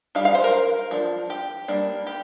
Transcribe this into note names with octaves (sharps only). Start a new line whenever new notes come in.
G3 D4 F5
F5
C5
A#4
F3 D4
G4
G3 A#3 D4
G4